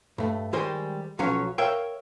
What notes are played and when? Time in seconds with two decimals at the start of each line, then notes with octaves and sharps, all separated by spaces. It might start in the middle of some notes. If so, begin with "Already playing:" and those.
0.18 G2 A3
0.53 D#3 G3 G#3 C5 D#5 G#5
1.19 B1 F3 F#3 C#4 C#5
1.58 A#4 C#5 E5 F5 G5